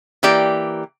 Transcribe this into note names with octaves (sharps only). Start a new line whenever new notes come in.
E3 A#3 G4 D5